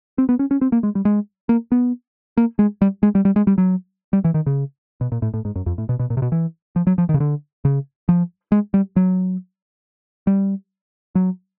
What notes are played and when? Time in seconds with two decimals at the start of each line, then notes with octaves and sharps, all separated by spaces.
0.18 C4
0.29 B3
0.39 C#4
0.51 C#4
0.61 C4
0.72 A#3
0.83 G#3
0.95 G3
1.05 G#3
1.49 A#3
1.72 B3
2.37 A#3
2.59 G#3
2.82 G3
3.03 G#3
3.15 G3
3.25 G3
3.36 G#3
3.47 G3
3.58 F#3
4.13 G3
4.24 E3
4.34 D#3
4.46 C#3
5.01 B2
5.12 A#2
5.22 A2
5.34 A2
5.45 G#2
5.56 F#2
5.66 F2
5.78 A2
5.89 B2
5.99 B2
6.10 A#2
6.17 C3
6.22 B2
6.32 E3
6.76 F3
6.87 F#3
6.98 F3
7.09 D#3
7.14 C#3
7.20 D3
7.65 C#3
8.09 F3
8.52 G#3
8.74 G3
8.96 F#3
10.27 G3
11.15 F#3